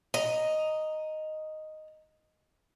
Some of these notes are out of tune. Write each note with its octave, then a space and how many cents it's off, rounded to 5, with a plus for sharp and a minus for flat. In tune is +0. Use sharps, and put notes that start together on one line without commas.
D#5 +0 A#5 +0